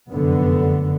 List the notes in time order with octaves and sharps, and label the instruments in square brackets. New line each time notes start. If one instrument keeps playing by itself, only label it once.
[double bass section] F1 F#2 D3 B3